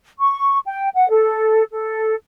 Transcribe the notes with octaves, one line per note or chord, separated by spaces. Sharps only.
C#6
G5
F#5
A4
A4